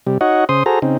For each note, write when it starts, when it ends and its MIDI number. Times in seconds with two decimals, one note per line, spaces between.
0.07 0.18 48
0.07 0.18 55
0.21 0.45 63
0.21 0.45 66
0.21 0.45 73
0.21 0.45 75
0.21 0.45 78
0.49 0.63 49
0.49 0.63 72
0.49 0.63 84
0.49 0.63 87
0.66 0.79 66
0.66 0.79 68
0.66 0.79 69
0.66 0.79 72
0.66 0.79 82
0.82 0.97 49
0.82 0.97 60
0.82 0.97 63